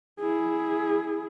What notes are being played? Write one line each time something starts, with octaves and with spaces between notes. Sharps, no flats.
E4 G#4